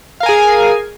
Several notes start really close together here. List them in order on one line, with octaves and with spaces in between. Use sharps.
F5 A#4 G#5 G#4